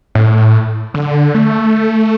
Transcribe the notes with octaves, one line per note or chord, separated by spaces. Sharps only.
A2
D3
A3